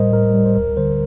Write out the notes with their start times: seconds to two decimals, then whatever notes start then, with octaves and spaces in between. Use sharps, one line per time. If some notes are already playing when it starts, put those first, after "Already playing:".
Already playing: A2 G3 A#4 C5 D#5
0.13 A2 A#4
0.34 G3
0.45 C5
0.55 D2 A#4
0.77 D3 G3 C5